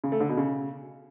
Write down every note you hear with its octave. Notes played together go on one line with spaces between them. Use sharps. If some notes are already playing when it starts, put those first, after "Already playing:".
C#3
A3
D3
B2
C#3